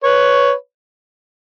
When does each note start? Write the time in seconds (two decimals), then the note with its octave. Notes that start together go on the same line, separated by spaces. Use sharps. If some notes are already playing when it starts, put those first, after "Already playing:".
0.04 B4 C#5